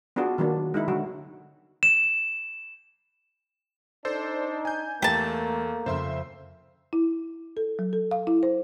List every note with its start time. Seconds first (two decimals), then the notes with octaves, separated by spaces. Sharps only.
0.16 B3 D4 F4 F#4 G#4
0.38 D#3 F#3 A#3 D4
0.74 G#3 D#4 E4
0.88 D3 F#3 F#4
1.83 E7
4.05 D4 D#4 A4 C5 D5
4.65 G#5 G6
5.02 E2 A3 A#3 G4 A5
5.86 F2 C#3 C5 E5 C6
6.93 E4
7.57 A4
7.79 F#3
7.93 A4
8.11 F5
8.27 E4
8.43 C5